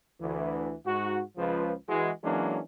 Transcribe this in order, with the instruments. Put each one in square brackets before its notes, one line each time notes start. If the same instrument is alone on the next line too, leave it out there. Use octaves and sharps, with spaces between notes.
[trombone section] D2 E3
G#2 F#4
C#2 F3 B4
E3 G#3 F#4
E3 F#3 G#3 A#3 C#4 D4